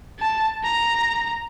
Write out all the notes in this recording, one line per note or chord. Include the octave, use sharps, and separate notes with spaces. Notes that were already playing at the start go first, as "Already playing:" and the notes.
A5
A#5